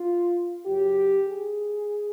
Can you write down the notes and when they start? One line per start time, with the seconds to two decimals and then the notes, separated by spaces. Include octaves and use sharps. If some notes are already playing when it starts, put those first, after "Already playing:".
Already playing: F4
0.66 F#2 C#3 F#3 G4
1.27 G#4